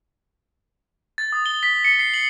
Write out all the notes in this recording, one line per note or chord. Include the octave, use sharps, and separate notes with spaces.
A6
D#6
G7
B6
C#7
C7
F#7